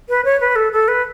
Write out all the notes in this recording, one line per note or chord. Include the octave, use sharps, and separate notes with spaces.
B4
C#5
B4
A4
A4
B4